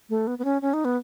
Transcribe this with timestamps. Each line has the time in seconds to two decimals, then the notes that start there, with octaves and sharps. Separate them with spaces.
0.09 A3
0.27 B3
0.38 B3
0.44 C#4
0.62 C#4
0.73 D#4
0.85 B3